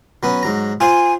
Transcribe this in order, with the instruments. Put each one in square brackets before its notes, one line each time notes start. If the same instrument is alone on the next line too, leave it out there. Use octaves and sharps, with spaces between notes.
[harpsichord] F#3 B3 C#4
G#2 F#3 A#5
[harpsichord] F4 C5 [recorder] G#5